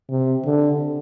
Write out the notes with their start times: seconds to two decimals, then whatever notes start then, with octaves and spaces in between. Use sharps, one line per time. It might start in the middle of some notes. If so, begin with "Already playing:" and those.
0.10 C3
0.45 D3